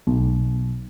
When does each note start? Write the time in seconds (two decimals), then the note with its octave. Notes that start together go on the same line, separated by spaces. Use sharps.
0.07 B1